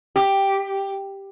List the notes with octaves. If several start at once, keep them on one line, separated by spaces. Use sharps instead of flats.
G4